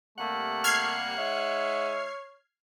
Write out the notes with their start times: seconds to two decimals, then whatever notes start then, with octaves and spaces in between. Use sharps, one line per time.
0.18 C3 G3 A3 A#3 F#5
0.64 F6 G#6 C7
1.18 G#3 D#4 C#5 E5